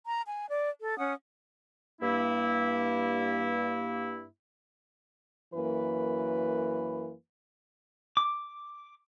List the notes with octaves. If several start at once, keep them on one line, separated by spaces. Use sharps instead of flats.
A#5
G#5
D5
A4
C#4 F#5 D#6
G2 A#3 E4
F#2 E3 A#3 B4
D6